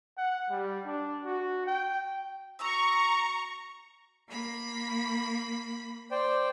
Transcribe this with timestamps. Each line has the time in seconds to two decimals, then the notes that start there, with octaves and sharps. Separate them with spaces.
0.18 F#5
0.50 G3
0.86 D4
1.24 F#4
1.66 G5
2.59 F#4 A#5 C#6 D#6 E6
4.28 A#3 B5
6.11 C5 D5 G5